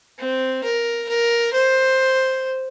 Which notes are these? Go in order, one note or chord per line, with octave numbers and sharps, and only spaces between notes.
C4
A#4
A#4
C5